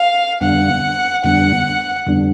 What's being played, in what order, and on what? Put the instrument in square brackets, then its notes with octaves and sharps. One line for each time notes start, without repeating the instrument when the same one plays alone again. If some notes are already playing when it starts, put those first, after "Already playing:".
Already playing: [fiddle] F5
[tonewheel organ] F2 D3 G3 B3 D4 [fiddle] F#5
[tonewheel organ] F2 D3 G3 B3 D4 [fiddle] F#5
[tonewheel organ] F2 D3 G3 B3 D4